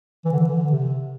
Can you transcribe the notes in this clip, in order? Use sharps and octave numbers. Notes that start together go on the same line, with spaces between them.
E3
D3
E3
D3
C3